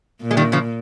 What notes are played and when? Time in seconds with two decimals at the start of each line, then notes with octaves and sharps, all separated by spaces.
0.22 A#2
0.31 G#3
0.37 D#3 G3
0.52 C#3 F3